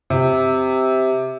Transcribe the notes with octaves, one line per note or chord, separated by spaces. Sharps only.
C3